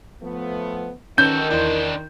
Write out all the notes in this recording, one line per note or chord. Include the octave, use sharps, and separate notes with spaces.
F3 A3 B3
D#3 C#4 F#4 A4 B4 G6
E2 D4 E4 C5 D5